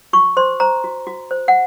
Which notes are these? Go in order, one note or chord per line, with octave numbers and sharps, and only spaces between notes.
F#4 C#6
C5 C6
C5 A#5
F#4
F#4
C5
F#5